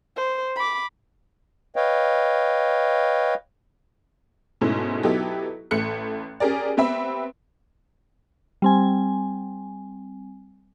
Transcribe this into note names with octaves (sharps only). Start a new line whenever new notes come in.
C5
B5 D6
B4 C#5 D#5 F5 G5
G#2 B2 A3 C#4 E4
F#3 B3 D#4 E4 G4 A4
A1 A3 F#6 C#7
C#4 G4 G#4 A#4 D5
B3 C4 G4 E5 B5
G3 C4 G#5